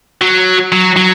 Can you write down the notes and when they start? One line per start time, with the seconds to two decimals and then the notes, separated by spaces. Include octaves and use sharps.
0.21 F#3
0.72 F#3
0.97 F#3